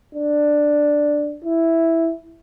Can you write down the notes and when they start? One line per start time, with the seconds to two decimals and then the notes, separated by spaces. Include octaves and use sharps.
0.15 D4
1.45 E4